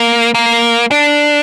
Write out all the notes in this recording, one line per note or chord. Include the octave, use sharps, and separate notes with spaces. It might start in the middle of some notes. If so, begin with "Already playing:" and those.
Already playing: A#3
A#3
D4